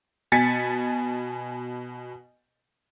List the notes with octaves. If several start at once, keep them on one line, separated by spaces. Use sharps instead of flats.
B2 G#5 A6 B6 C#7